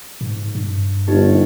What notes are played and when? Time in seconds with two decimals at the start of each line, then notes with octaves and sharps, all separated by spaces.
0.21 G#2
0.55 G2
1.08 G1 D#4 G4